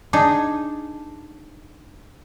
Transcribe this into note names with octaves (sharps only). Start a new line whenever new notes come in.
D4 D#4 G#4